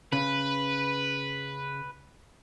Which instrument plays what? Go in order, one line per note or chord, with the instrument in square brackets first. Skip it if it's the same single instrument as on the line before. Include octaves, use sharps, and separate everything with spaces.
[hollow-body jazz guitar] C#3 [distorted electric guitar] B4